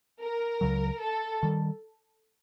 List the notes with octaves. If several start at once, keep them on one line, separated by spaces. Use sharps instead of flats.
A#4
C#2 C#3 F#3
A4
D#3 G3